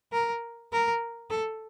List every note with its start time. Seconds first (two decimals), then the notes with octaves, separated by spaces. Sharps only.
0.13 A#4
0.72 A#4
1.30 A4